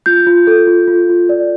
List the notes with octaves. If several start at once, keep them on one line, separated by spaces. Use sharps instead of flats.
F4 G6
F4
A4
F4
F4
F4
D5